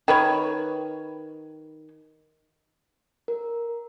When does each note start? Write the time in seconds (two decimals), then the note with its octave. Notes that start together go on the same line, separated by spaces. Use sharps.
0.08 D#3 B4 C#5
3.28 A#4